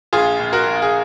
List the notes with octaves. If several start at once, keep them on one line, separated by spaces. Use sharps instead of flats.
A#1 F4 G#4
A#1
F#4 A#4
A#1
G#4